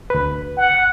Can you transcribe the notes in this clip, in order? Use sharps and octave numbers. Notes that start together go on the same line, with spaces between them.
D2 B4
F#5